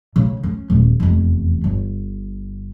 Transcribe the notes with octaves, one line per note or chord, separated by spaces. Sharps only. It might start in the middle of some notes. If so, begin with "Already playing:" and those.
C#3
C#4
D#1
F1 E2
G1